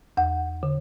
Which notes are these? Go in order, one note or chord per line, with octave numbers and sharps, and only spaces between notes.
E2 F#5
D3